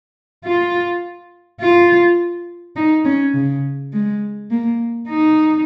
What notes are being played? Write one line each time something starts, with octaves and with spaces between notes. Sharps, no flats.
F4
F4
D#4
C#4
C#3
G#3
A#3
D#4